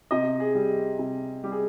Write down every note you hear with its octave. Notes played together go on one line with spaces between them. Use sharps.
C3 D#5
G#4
G3
C3
G3 G4
G#4